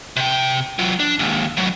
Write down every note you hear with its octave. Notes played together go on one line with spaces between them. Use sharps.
C3 G5
F#3 F4
D4
D#2 G#2
A2 F#3